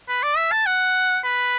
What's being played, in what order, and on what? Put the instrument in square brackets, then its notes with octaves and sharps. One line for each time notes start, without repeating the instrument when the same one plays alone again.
[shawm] B4
D5
E5
A5
F#5
B4